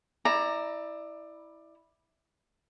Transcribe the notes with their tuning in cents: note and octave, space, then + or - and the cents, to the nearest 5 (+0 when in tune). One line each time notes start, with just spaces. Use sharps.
E4 -10 D5 +20 A#5 +0